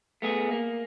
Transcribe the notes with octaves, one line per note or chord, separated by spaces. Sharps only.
A3 B3 G#4
A#3